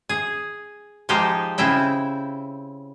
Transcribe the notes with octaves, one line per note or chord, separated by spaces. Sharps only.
G#4
F3 G#3 D#4 G4 C5
C#3 C4 E4 G5